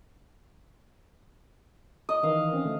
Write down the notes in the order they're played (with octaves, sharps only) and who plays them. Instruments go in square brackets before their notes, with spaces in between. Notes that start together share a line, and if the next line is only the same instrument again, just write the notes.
[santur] D#5
[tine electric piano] D#3 E3 [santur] F5
[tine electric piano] C4 C#4
D3 A3